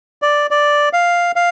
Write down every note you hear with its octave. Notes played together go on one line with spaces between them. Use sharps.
D5
D5
F5
F5